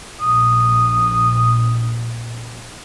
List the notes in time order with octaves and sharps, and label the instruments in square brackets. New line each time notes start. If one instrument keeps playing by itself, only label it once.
[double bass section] A#1 [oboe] D#6